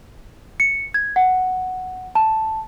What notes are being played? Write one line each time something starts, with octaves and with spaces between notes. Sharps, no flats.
C#7
G#6
F#5
A5